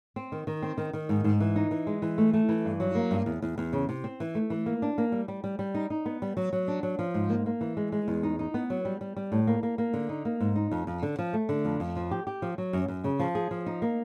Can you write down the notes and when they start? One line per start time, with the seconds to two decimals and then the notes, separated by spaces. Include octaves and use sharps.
0.16 C4
0.32 D#3
0.47 D#3
0.62 C4
0.78 D#3
0.93 D#3
1.09 G#2
1.24 G#2
1.40 E3
1.56 D#4
1.71 E3
1.87 G#3
2.02 E3
2.18 A3
2.33 A3
2.49 E3
2.65 G2
2.80 F#3
2.95 A#3
3.11 G2
3.26 E2
3.42 E2
3.58 E2
3.73 C#3
3.89 C3
4.04 C4
4.20 E3
4.35 A3
4.50 E3
4.66 A#3
4.82 D4
4.98 A#3
5.12 G3
5.28 G3
5.44 G3
5.59 G3
5.75 D#4
5.90 D#4
6.06 B3
6.22 G3
6.37 F#3
6.53 F#3
6.68 D4
6.83 F#3
6.99 F3
7.14 G#2
7.29 A#3
7.46 A#3
7.61 E3
7.77 G#3
7.92 G#3
8.08 E2
8.23 D#4
8.39 D#4
8.54 B3
8.70 F#3
8.85 G3
9.01 G3
9.17 G3
9.32 A2
9.47 A#3
9.63 A#3
9.78 A#3
9.94 D3
10.09 D#4
10.25 A#3
10.40 G#2
10.56 D#4
10.71 F2
10.87 F2
11.03 D3
11.19 F3
11.33 A3
11.49 D3
11.65 F2
11.80 F2
11.96 F3
12.11 G4
12.27 G4
12.42 F3
12.58 F#3
12.73 F#2
12.88 F#2
13.04 C#3
13.20 F3
13.35 G#4
13.51 F3
13.66 D#4
13.82 A#3